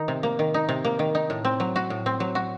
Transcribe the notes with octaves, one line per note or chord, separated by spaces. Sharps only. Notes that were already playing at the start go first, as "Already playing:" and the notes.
Already playing: D#3 D#4
C3
A#3
D#3
D#4
C3
A#3
D#3
D#4
A2
C4
F#3
F#4
A2
C4
F#3
F#4